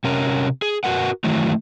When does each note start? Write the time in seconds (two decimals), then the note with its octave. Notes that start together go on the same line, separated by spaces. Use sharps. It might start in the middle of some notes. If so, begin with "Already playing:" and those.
0.04 C3 C#4 A#4
0.62 G#4
0.84 F#4 A#4 B4 F#5
1.24 D#3 E3 F#3 A3